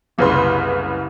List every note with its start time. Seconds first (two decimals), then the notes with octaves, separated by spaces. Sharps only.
0.18 F#1 C2 C#3 B4 B5 C6